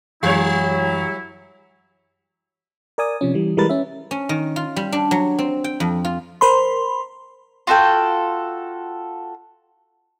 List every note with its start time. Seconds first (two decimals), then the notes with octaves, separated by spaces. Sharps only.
0.23 F#2 E3 F#3 G3 E4 C#5
2.98 A#4 D5 G#5 D#6
3.21 C3 F3 C#4
3.34 E3 G3
3.57 E3 G3 G#3 A#4 B4 A6
3.69 C#4 E5
4.11 C#4
4.29 D#3
4.56 F4
4.76 G3
4.92 D4
5.11 F#3
5.38 C4
5.64 G5
5.80 F2
6.05 F4
6.41 A#4 C5 B5 C6
7.67 F4 F#4 A4 G5